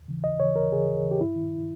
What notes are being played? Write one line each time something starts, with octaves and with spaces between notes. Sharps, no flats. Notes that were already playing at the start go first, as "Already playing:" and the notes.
Already playing: D#2
C#3 E3
D#2 D#5
C#3 E3 C#5
D#2 A#4
C#3 E3 G#4
D#2
C#3 E3
G4
G2 E4
D#3